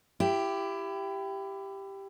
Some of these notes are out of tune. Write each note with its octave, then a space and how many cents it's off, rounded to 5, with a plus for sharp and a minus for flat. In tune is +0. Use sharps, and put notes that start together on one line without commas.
E4 +25 G4 +0